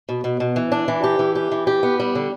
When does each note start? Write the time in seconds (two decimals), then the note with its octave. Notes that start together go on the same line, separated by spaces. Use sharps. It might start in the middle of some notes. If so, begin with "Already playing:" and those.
0.09 B2
0.24 B2
0.40 B2
0.56 E3
0.72 D4
0.88 E3
1.04 G4
1.19 E3
1.35 G4
1.51 E3
1.67 G4
1.83 B3
2.00 G3
2.15 D3